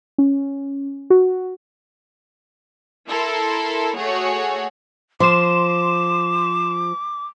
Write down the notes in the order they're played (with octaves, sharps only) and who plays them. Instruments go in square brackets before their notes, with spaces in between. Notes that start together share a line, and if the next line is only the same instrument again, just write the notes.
[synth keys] C#4
F#4
[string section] E4 A4 A#4 C6
A3 F#4 G#4 C#5
[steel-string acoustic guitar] F3 [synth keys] C6 E7 [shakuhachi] D6